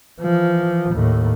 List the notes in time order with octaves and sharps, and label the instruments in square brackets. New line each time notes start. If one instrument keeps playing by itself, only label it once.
[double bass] E3 F3
D#2 A2